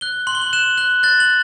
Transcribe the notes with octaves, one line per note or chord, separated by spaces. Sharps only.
F#6 G7
C6 F#7
G7
F#7
F#6 E7
F#6
F#6 A6
F#7